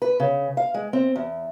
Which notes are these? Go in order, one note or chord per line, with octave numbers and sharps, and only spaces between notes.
B4
C#3
F5
G#3
C4
E2